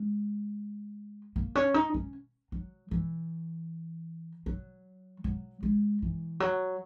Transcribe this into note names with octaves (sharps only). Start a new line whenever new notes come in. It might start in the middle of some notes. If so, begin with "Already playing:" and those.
Already playing: G#3
A#3
C#4
D#4
C#4
F#3
E3
F#3
F#3
G#3
E3
F#3